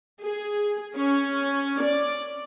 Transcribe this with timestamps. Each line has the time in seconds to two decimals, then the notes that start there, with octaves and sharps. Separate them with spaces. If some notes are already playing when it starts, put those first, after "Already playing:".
0.21 G#4
0.95 C#4
1.80 D5